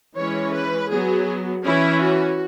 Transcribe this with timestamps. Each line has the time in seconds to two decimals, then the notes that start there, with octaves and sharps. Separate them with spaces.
0.16 E3 G#3 C#4 C#5
0.53 B4
0.90 F#3 B3 G#4
1.64 E3 C#4 E4
2.02 F#4